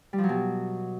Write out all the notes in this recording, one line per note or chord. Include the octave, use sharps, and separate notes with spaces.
G3
F3
F#3
B2